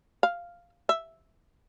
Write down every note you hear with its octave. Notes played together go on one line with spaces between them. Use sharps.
F5
E5